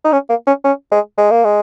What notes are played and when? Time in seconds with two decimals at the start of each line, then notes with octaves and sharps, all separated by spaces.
0.05 D#4
0.12 C#4
0.29 A#3
0.47 C#4
0.64 C#4
0.91 G#3
1.18 G#3
1.31 A#3
1.44 G#3